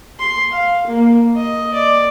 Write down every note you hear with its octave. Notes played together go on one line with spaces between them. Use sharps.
C6
F5
A#3
D#5
D5